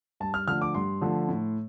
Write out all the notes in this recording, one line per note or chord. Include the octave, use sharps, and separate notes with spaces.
G2 A5
F6
D3 F3 A3 F6
D6
G2 C6
D3 F3 A3
A2